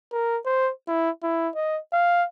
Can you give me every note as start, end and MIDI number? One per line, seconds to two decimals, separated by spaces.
0.12 0.38 70
0.45 0.71 72
0.88 1.10 64
1.23 1.49 64
1.55 1.79 75
1.92 2.26 77